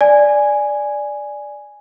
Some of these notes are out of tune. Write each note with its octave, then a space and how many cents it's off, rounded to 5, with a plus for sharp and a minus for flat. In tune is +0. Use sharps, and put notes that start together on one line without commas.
D5 +0 G#5 +0